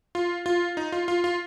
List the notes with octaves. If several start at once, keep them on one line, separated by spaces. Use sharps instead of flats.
F4
F4
D#4
F4
F4
F4